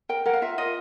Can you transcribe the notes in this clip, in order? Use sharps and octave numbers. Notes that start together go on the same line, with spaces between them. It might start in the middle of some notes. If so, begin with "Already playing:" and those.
A#4 G5
A#4 F#5
F5
F4 E5
F4 D#5